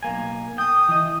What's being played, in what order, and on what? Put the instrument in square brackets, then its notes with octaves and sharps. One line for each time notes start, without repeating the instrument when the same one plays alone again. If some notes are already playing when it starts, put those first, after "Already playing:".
[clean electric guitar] B1 A#3 G#5
[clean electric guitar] G5 [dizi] D#6
[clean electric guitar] E3 D#5